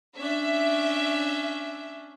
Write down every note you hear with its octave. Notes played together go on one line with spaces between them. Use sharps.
C#4 D4 E5